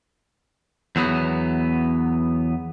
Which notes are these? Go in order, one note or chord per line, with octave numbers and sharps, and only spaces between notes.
E2 F#3 B3